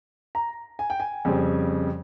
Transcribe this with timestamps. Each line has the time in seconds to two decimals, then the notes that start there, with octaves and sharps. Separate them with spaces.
0.35 A#5
0.79 G#5
0.90 G5
1.00 G#5
1.25 F2 C#3 G3 C4